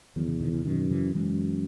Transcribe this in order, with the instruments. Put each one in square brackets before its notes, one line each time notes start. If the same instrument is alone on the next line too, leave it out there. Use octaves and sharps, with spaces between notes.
[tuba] E2 [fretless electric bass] D#3 F#3
[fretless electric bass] C#3 E3
B2 D#3
C#3 E3
[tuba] F#2 [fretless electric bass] B2 D#3
[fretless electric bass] C#3 E3
[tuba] F#2 [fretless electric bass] E3 G#3